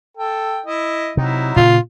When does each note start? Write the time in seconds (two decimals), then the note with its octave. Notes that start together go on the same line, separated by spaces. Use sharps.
0.17 A4 G5
0.66 E4 D#5
1.17 C3 F#3 D#4 E4
1.56 A#2 C#3 F4